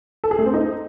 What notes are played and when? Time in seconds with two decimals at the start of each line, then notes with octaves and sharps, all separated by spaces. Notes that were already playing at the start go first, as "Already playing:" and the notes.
0.24 A4
0.31 G#4
0.39 A3
0.46 C4
0.54 D#4